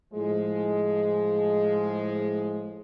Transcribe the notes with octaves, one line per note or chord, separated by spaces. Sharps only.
A2 F3 G#3